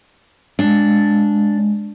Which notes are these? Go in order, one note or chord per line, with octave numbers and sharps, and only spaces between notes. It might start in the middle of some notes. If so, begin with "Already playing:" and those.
G#3 D4